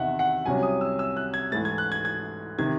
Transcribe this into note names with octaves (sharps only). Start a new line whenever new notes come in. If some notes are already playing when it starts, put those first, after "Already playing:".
Already playing: E2 C3 D#3 D#5 E5 F#5
F#5
C2 C3 F#3 C#4 G#5
D#6
E6
E6
F#6
G#6
G#2 E3 A3 A6
G#6
F#6
G#6
G#6
C3 D#3 G#6